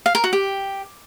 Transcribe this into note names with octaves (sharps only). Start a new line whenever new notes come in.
F5
A#4
F#4
G4